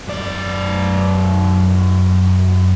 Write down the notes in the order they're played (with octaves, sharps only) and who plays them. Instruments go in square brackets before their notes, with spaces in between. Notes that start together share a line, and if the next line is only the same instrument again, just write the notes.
[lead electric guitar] F#2 D5